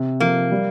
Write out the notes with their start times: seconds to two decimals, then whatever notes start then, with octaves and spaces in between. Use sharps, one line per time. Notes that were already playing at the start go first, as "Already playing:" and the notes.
Already playing: C3
0.20 F3 A#3
0.51 G3